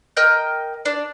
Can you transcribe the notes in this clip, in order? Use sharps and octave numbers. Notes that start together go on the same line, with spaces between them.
A#4 D#5 G5 G6
D4 D5